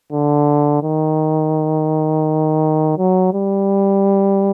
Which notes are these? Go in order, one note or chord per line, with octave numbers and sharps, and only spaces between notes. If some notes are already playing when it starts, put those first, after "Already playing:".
D3
D#3
F#3
G3